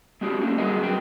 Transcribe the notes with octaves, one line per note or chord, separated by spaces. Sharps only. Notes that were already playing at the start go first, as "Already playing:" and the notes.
G#3 C4 D4 F#4 G4
A3 A#3 C#4 D4
G3 F#4 G#4 A#4 D#5
G2 F#3 C4 F#4 G5